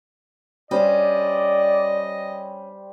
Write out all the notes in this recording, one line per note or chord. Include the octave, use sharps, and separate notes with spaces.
G3 C#4 C5 D5 D#5